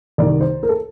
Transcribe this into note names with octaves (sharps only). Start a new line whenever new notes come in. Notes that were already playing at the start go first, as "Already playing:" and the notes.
C2 C3 D#3 D5
C5
A#4
A4